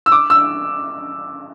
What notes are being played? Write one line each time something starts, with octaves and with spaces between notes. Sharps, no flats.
E6
D6
E6